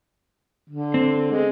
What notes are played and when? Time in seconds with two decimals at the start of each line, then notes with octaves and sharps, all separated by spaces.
0.70 D3
0.94 C4
1.31 G#3